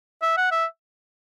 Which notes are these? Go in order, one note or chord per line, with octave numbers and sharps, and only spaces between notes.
E5
F#5
E5